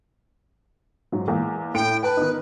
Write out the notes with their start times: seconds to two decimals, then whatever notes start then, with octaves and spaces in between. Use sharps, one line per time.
1.12 G#2 F#3
1.28 E2 G#3 A#3
1.74 A2 G5 D7
2.03 B4 G5 A5
2.17 D#3 B3 D#4